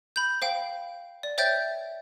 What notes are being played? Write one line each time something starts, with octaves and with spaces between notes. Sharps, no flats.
B5 G6
C5 F5 G5
D5
C5 C#5 E5 G5 G6 A6